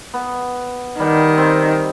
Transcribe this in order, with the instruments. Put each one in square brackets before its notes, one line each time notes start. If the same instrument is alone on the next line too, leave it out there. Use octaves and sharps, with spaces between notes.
[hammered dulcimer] B3
[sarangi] D#3 [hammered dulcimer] G3 F#5
[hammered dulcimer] C4